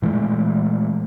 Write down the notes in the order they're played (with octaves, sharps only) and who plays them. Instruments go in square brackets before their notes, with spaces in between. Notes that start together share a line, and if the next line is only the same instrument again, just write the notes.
[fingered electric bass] A#2 E3 G#3 A3